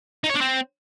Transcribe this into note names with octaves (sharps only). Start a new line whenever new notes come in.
D#4
C#5
D4
C4